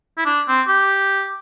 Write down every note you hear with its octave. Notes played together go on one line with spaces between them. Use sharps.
E4
D4
C4
G4